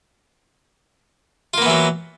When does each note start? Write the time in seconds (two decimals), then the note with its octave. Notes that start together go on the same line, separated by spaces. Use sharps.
1.54 F4
1.58 A#3
1.62 B3
1.66 E3
1.70 F#3